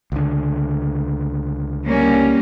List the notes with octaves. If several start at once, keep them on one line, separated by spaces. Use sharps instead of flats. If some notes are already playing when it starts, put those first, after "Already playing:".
C#2 D3
G3 A#3 C#4